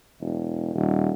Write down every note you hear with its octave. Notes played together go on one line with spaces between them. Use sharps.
E1
D#1